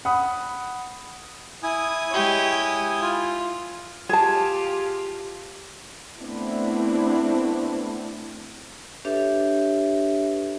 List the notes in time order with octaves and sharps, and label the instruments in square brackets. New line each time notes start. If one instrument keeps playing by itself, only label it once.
[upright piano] F#5 B5 D#6
[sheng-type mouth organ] E4 G#5 D#6
[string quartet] G#3 G4 C#5
F4
[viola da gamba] F4 G4 [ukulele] G#4 A5
[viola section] A3 B3 C4 D4 E4
[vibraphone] D4 G4 A4 B4 C#5 E5